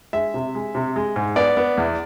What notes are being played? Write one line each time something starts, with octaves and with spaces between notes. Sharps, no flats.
G#3 E5
C3
G#3
C3
G#3
G#2
B3 D5
B3
E2